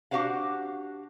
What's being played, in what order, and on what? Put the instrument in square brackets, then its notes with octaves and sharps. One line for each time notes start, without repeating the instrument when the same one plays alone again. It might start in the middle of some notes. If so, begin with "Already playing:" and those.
[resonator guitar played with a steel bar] D4 F#4 G4 C5 F5 F#5